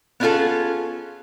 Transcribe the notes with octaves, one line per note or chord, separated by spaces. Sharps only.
B3 C#4 D4 F4 G#4 A4